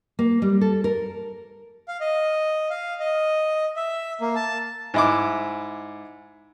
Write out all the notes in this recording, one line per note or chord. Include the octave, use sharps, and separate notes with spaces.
A#3
G3
A4
A#4
F5
D#5
F5
D#5
E5
A#3
A5
G#2 E4 D6